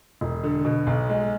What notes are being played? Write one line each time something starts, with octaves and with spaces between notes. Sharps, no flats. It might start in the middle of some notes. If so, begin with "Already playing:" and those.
E1
D3
B2
B1
G#3